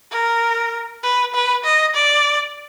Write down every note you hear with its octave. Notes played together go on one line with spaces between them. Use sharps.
A#4
B4
B4
D#5
D5